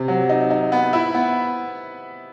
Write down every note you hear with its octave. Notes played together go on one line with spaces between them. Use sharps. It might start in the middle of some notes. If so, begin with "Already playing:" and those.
Already playing: C3
F#3
D#4
D#4
B3
E4
B3